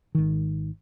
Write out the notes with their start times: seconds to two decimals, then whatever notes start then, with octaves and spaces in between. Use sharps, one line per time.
0.15 G#1 D#3